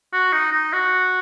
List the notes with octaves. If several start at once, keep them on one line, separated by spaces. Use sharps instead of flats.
F#4
D#4
D#4
F#4